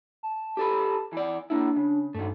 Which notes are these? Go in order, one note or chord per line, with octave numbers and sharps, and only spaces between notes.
A5
G4 A4 B4
E3 D5
A#3 D4 E4
C#3
G2 D#3 A3